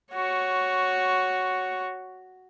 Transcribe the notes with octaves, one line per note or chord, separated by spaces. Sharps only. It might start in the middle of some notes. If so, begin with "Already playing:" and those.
F#4 C#5